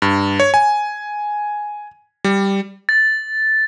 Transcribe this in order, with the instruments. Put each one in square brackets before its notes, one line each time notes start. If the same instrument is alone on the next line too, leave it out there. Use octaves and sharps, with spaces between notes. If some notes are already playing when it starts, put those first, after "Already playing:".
[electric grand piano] G2
C#5
G#5
G3
[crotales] A6